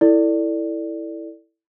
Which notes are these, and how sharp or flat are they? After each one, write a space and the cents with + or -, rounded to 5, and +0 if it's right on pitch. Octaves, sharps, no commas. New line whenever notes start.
E4 +0 A4 +20 D5 +0